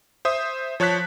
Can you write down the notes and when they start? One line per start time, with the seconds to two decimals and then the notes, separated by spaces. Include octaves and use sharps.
0.25 C5 E5 D#6
0.80 F3 C#5 A5 F#6 B6